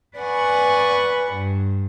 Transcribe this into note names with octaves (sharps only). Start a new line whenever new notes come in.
B4 D5 F#5 G#5 C#6
G2